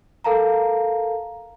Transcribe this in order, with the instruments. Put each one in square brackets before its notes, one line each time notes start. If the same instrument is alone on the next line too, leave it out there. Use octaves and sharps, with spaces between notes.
[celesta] A4 A#4 F5 A5 A#5